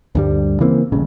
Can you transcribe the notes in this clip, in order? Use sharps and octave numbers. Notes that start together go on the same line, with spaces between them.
D2 G2 G3
C#3 E3 A#3 C4
D#1 A1 C#3